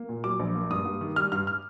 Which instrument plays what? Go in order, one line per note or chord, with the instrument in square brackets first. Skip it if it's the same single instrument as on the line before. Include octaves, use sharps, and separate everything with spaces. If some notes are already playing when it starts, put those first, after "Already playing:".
Already playing: [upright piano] A#3
A#2
F#3 D6
A#1
A#3
G2 D#6
G2
D#3
G3 F6
G2 F6
F6